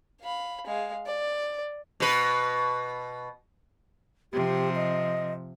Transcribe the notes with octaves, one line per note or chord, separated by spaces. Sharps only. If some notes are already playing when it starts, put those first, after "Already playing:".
F5 B5
G#3 F5
D5
B2 B4
C3 F3 G4
D#5